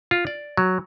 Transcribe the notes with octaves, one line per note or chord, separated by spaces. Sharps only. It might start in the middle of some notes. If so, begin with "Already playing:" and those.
F4
D5
F#3